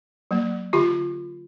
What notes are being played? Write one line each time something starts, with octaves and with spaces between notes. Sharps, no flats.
F#3 A#3
D3 F4 G4